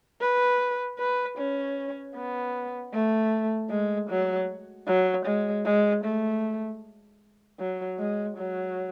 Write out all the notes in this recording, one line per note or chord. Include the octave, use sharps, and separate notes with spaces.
B4
B4
C#4
B3
A3
G#3
F#3
F#3
G#3
G#3
A3
F#3
G#3
F#3